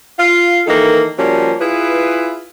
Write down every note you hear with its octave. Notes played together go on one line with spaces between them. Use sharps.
F4 F5
D#3 E3 A#3 D#4 A4
F3 G3 A#3 C#4 F#4
E4 F4 G#4 B4